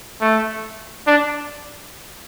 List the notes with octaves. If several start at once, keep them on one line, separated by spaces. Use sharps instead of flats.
A3
D4